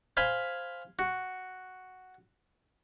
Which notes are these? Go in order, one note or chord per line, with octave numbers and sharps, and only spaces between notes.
C5 F5 G#5 B5 C6
F#4